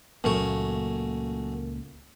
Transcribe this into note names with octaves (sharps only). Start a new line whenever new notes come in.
C#2 F#2 A#2 A3 A#3 C#5